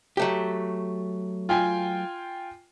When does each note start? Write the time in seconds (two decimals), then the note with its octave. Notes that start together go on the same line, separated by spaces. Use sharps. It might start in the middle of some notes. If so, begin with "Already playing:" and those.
0.17 F#3 A3 G4
1.49 F4 G5 G#5